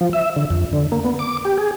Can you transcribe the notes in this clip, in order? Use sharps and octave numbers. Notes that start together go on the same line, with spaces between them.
F3
E5
D3
F2
D3
A#3
B3
D6
G4
G#4